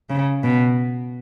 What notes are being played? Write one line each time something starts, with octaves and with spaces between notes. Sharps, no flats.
C#3
B2